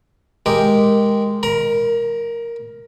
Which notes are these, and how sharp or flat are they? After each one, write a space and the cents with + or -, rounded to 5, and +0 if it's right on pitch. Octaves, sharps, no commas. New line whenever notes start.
G#3 +0 G4 +0 A#4 +0
A#4 +0 A#5 +35